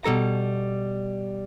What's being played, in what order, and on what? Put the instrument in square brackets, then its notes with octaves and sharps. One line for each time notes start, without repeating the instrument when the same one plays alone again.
[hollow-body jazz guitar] B2 G3 A4 A#5